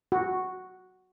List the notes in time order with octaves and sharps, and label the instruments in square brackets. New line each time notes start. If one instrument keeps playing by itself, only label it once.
[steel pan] F#4